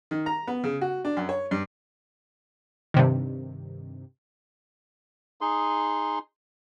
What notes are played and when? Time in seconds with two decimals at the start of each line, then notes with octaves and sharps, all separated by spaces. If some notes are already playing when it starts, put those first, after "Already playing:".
0.11 D#3
0.26 A#5
0.47 B3
0.64 C#3
0.81 F#4
1.05 D4
1.17 F#2
1.29 C#5
1.51 G2
2.94 G2 C3 D#3
5.41 D#4 G#4 C6